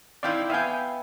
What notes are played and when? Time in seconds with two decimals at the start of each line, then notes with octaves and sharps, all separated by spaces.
0.23 C4 D#4 E4 D5 F5 G5
0.50 B3 E5 F5 G5 G#5